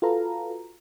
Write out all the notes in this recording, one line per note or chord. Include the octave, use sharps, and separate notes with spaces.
F4 F#4 A4 B4 F5 A#5